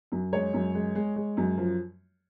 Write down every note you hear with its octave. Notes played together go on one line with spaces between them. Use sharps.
F#2
G#3 C#5
F#2
G#3
G#3
G#3
F#2
F3